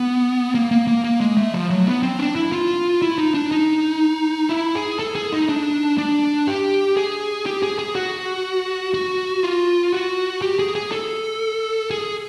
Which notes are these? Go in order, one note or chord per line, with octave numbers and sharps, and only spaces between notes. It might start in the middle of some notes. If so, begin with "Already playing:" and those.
Already playing: B3
A#3
A#3
A#3
A#3
G#3
A3
F3
F#3
B3
C4
D4
E4
F4
E4
D#4
D4
D#4
E4
G#4
A4
G#4
D#4
D4
D4
G4
G#4
G4
G#4
G#4
F#4
F#4
F4
F#4
G4
G#4
G#4
A4
G#4